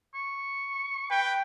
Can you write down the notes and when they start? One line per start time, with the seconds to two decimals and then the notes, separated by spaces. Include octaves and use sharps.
0.14 C#6
1.11 B4 G5